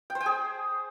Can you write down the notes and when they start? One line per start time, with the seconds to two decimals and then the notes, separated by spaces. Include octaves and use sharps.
0.10 G5
0.15 C5
0.20 G5
0.26 G#4